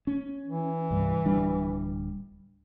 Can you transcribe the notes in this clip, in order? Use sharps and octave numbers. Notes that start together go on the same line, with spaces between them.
C#4
E3
C2 G2
D1 G3 D4